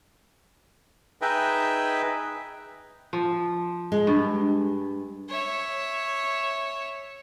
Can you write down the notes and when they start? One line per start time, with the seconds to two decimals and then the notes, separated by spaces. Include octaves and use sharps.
1.22 D#4 G#4 B4 D#5 E5 G5
3.13 F3
3.92 G#3
4.07 G2
5.29 C#5 E5